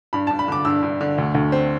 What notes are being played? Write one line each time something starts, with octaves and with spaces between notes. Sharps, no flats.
G2 B5
A5
G2
B5
D3 D6
G2 E6
G2
D3
D2
D2
C4